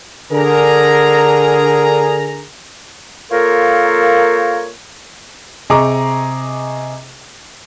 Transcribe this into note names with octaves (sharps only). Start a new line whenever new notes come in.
D3 G#4 A#4 A#5
A#3 F4 A4 A#4 C5 C#5
C3 G#4 D#5 A#5 C#6 D6